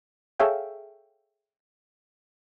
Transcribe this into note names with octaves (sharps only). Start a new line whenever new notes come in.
G#4 A4 C#5 E5 F5 G5